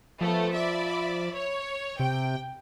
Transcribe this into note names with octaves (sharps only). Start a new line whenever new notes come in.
F3 A3 B3
D5 E5 B5
C#5
C3 G5